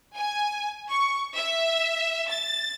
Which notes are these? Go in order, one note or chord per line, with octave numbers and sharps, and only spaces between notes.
G#5
C#6
E5
A6